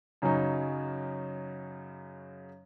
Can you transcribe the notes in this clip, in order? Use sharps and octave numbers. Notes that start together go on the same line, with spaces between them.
F#2 C#3 F#3 C#4 D#4